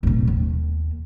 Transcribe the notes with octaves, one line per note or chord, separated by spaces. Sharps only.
D1 B2
D#2